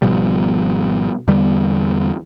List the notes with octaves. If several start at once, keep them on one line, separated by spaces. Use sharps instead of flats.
G#1 B2 F3 G3
E2 D3 G3 B3